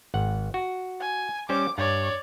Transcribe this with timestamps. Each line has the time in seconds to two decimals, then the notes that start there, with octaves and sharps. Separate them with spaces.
0.14 G#1 F#5
0.54 F#4
1.01 G#5
1.49 G3 C#4 C5 D6
1.78 G2 C#5 D5